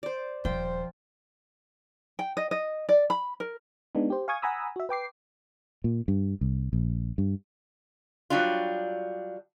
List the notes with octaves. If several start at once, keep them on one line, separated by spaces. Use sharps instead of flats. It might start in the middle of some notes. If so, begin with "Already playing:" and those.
C5 D5
D#1 F3 C5 G5
G5
D#5
D#5
D5
B5
A#4
G#3 B3 D4 D#4
G4 C5
F5 G#5 C#6 D#6 G#6
F#5 G#5 A#5 B5 D#6 E6
F#4 E5
B4 G5 D6 C7
A#2
G2
C2
A#1
G2
F#3 G3 D4 F4